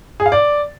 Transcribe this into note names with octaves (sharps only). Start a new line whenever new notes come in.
G#4
F5
D5